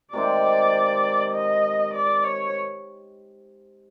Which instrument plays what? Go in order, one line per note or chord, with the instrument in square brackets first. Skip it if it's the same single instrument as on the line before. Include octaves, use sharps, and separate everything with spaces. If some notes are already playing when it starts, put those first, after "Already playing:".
[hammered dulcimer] C3 D#3 G#3 C4 [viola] D5
[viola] D#5
D5
C#5